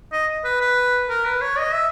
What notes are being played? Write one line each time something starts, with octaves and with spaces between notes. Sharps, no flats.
D#5
B4
B4
A#4
B4
C#5
D#5
E5